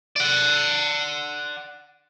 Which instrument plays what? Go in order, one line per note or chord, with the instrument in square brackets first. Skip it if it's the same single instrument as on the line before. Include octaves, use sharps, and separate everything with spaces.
[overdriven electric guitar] D5 F#5